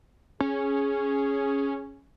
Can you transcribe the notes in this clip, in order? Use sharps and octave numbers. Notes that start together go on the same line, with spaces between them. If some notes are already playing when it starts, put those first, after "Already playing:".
C#4 G#4